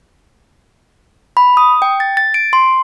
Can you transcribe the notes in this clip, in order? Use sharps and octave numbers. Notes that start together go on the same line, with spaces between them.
B5
D#6
G5
A6
A6
D7
C6